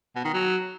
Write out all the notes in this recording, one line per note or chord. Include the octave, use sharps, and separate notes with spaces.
B2
D#3
F#3